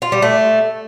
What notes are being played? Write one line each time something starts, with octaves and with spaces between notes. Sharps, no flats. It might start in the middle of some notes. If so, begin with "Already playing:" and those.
F4
G3
A3